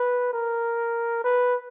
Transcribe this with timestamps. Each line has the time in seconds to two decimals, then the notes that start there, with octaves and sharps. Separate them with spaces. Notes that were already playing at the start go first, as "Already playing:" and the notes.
Already playing: B4
0.33 A#4
1.24 B4